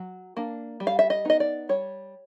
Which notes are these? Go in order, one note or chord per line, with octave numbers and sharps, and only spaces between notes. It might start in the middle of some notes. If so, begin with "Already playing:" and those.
Already playing: F#3
A#3 D4
G3
F5
E5
D#5
B3 D#4 D#5
D5
G3 C#5